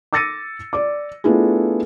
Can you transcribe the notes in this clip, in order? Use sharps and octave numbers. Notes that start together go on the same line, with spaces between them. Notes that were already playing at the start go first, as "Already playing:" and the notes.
D6 E6 A6 A#6 C#7 D#7
D5 D6
A3 B3 D4 E4 F4 G#4